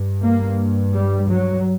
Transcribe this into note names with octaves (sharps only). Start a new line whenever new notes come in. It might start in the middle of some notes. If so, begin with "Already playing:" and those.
Already playing: G2
A#3
G3
F#3